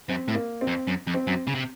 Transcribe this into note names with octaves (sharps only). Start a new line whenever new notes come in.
F#2 C4
A2
A#3
C4
F2
F#2
F2
C4
F#2
C#3
C3